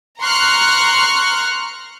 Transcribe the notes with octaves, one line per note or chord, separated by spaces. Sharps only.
A#5 C6 C#6 F6 F#6